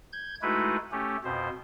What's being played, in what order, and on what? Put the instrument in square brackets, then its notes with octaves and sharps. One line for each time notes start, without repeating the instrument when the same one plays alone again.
[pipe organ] G6 G#6
G#3 A3 D#4 E4 F#4 B4
A3 C#4 G4
F2 B2 C5